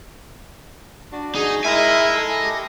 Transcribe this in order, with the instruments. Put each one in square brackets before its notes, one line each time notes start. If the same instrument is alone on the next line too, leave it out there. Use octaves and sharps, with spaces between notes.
[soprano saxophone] D4 [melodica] F#4
[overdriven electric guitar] D#4 [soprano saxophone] G#4
[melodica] G#3 E4 A#4 [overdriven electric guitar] D#5 G#5 [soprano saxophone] E5
[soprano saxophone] A4
[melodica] G4